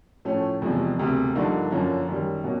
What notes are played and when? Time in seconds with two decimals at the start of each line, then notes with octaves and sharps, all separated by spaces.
0.25 A2 F3 A3 C#4
0.61 F1 E2 C3 F3 G#3
0.98 E1 D2 C3
1.35 G2 D3 F3 A#3 D#4
1.71 F#2 D3 F3 A#3 C#4
2.08 F#2 D#3 G3
2.44 B2 F#3 A#3 C#4